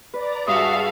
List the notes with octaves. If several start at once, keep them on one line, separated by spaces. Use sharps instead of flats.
B4 D5 A#5 D6
G2 F#4 G#4 E5 F5 A5 D#6